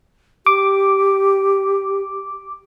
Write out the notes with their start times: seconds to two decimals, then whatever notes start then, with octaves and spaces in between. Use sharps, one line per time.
0.46 G4 D6